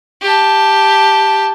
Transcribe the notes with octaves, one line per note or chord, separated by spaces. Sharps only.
G4 A5